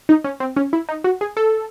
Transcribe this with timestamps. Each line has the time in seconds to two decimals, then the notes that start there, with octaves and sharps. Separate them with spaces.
0.09 D#4
0.24 C#4
0.40 C4
0.56 C#4
0.73 E4
0.89 D#4
1.04 F#4
1.21 G#4
1.37 A4